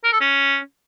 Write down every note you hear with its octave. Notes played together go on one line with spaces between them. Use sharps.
A#4
A4
C#4